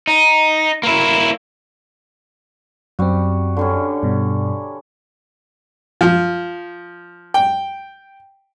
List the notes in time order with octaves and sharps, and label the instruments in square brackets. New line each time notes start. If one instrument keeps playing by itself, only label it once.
[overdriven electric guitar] D#4
A#3 E4
[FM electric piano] F#2 C4 [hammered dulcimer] G3 F#4
[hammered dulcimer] D3 G3 C#4
[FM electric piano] G2 B2
[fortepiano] F3
G5